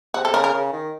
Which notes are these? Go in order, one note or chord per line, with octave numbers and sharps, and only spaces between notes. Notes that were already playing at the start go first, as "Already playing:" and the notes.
C3 F#4
A4
C#3 A#4
A#4
C#3
D#3